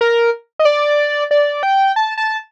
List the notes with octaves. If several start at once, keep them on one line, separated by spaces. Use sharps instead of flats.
A#4
D#5
D5
D5
G5
A5
A5